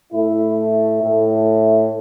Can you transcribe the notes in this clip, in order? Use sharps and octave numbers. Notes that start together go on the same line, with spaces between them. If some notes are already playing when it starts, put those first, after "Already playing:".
A2 A3 E4
A2 A3